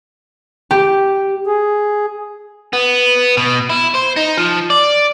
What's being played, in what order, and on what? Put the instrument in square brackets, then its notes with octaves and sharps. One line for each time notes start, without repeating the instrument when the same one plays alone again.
[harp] G4
[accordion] G#4
[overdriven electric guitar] B3
B2
E4
C5
D#4
F3
D5